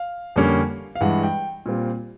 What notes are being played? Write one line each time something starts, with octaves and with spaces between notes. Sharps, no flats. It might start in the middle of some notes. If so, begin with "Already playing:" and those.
Already playing: F5
F2 D3 G3 A#3 C#4
F5
G2 E3 G#3 F#5
G5
A#2 G3 C4 F4